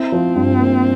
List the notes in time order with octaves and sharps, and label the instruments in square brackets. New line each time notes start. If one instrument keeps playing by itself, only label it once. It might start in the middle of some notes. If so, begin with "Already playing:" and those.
Already playing: [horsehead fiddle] C4 [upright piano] E4
[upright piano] F3
G2
A#3